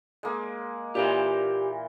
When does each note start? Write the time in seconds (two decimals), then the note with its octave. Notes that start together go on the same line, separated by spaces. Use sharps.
0.23 G#3 A#3
0.95 A#2 E3 G4 F5 C6